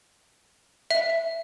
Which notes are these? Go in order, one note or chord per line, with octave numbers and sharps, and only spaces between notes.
E5